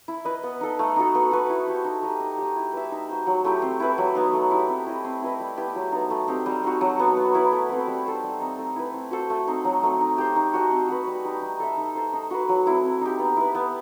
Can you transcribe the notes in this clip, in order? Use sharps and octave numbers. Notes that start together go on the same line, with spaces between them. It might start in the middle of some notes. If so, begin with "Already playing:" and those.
E4
B4 D#5
B3
D#4 A4
A3
D#4 F#4 A4
B3
F#4 B4
E4
G4 C5
D#4
G4 D#5
D#4
G4 D#5
E4
B4 E5
D#4
F#4 C5
F#3
A3 E4 G4
C4
E4 B4 E5
F#3
B3 D#4
A3
E4 G4
C4
E4 G4 D#5
C4
E4 B4 D#5
G3
B3 E4 G4
F#3
B3 D#4
A3
C4 D#4 G4
G3
C4 D#4 F#4
F#3
B3 D#4
B3
E4 B4
A3
C4 F#4 B4
G3
D#4 A4 C5
G3
C4 D#4
A3
E4 B4
C4
F#4 A4 C5
A3
C4 D#4
F#3
A3 C4
D#4
G4 C5
D#4
F#4 A4 D#5
C4
F#4 B4
G3
D#4 G4
D#4
A4 E5
D#4
A4 C5
D#4
F#4 B4
F#3
C4 E4
C4
D#4 G4
B3
E4 B4
B3